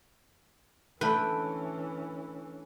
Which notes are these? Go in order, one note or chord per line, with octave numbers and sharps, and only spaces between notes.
D3 E3 A3 C#4 B4 G5